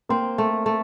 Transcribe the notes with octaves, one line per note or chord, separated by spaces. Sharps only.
A#3 C4
A3
A3